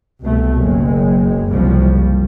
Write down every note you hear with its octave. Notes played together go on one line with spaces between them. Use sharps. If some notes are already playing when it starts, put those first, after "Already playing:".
C2 B2 A3
F#1 F#2 G#3
F#1 C2 F3 G3